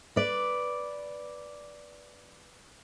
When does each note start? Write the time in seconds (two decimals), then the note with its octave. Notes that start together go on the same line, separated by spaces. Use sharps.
0.16 B4 D5